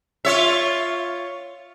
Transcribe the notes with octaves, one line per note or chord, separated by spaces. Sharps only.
F4 C#5 E5